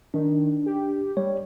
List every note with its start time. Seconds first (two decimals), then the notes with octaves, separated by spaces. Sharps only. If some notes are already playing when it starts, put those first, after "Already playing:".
0.14 D#3 D4
0.66 G4
1.17 G3 C#5